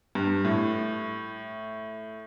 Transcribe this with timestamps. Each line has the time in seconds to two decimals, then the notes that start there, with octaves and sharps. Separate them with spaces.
0.15 G2
0.45 A2